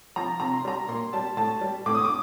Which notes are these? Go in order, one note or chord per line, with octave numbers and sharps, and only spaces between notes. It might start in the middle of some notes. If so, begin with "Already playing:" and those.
F3 A#5
C3 A#5
C6
G3 A#5
A#2 C6
G3 A5
A2 A5
G3
A2 D6
D#6
D6